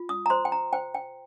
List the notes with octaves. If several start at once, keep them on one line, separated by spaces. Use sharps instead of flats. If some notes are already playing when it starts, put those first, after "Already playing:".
Already playing: F4
D#6
A#5
C5 C6
G5
A#5
C5 G5
G5